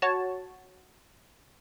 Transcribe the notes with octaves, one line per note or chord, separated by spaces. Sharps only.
F#4 C#5 A5